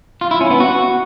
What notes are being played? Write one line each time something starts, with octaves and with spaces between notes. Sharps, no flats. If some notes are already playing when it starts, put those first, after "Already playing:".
F4
E4
C#4
B3
F#4